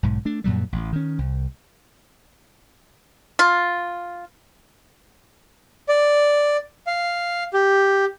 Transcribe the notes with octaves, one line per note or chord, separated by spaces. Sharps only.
B1 G#2
A3 D4
F#2 A#2 F#3 G3
A1
D#3 C#4
C2
F4
D5
F5
G4